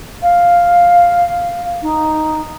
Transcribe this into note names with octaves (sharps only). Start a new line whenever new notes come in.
F5
D#4